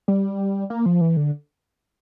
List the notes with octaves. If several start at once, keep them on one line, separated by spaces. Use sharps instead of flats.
G3
A#3
F3
E3
D3